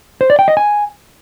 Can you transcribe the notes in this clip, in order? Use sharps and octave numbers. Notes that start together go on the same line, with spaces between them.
C5
D5
G5
D#5
G#5